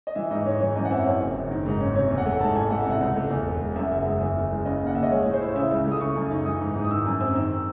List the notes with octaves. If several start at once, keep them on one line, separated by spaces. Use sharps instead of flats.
D#5
E3 E5
G#2 D#5
G#2 C#5
E3 C#5
F#2 D#5
F#5
C4 E5
F#2 C#5
F#1
F#1
D#3
G#2
C#4
C3 C#5
E2
F#5
A3
G#2 A5
A1 G#5
A3 F#5
E5
C3 F#5
C#2
A3
E2
E1
G#3
F#2 E5
F#5
F#1 E5
G#3
E2 E5
F#1
G#3
C#3 D#5
D#2
F#5
D#2 E5
D#5
G#3 C#5
C#5
A2
C5
E4 C#5
C#3 E5
C#2
A3
D#6
C#3 C#6
F#2
D#4
E3 D#6
G#2
G#2
D#6
D#3 E6
F#2
C4 E6
D#3 E6